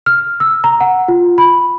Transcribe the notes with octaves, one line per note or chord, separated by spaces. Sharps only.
F6
E6
A#5
F#5
F4
B5